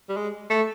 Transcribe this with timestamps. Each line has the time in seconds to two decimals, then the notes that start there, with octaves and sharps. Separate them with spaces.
0.09 G3
0.17 G#3
0.50 A3